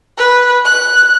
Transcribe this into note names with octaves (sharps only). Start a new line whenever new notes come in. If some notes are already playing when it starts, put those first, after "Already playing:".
B4
F#6